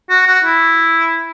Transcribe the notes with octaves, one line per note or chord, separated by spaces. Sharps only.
F#4
F#4
E4